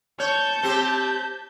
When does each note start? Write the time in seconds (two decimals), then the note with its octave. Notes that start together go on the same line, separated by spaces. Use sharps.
0.20 C#5 A5 G6
0.63 C4 G4